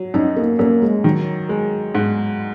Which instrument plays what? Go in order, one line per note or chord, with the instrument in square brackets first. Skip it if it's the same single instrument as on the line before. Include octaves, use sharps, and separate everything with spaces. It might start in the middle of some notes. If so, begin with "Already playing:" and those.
Already playing: [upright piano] F#3
[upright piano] F#2 [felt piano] D#4
[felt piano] A#3
[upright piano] F#2 [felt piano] A#3
[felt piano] G#3
[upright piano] D#3 [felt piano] F#3
[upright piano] G#3
G#2